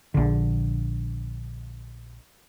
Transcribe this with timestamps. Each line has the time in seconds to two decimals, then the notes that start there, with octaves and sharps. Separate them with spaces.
0.14 A#1 D3